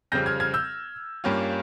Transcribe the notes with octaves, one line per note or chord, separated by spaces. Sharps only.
F2 C#3 G3 C4 G6 A#6
F6 G#6
F6 G#6
E6 G6
G2 G3 A#3 C#4 F4